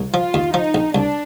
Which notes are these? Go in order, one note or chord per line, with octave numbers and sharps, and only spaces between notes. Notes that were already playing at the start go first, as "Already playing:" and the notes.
Already playing: C2
F3 F4
D#2
F3 D#4
A#1
C2 D4